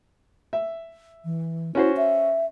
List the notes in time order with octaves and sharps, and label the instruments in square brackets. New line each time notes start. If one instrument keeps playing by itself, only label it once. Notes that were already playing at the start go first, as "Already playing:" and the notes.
[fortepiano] E5
[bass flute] E3
[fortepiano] C#4 F#4 C5 [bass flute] E4
[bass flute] E5